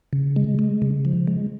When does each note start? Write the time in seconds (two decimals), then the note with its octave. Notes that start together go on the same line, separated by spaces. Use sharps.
0.13 C#3
0.36 G#3
0.59 G#3
0.82 C#3
1.05 F3
1.27 G#3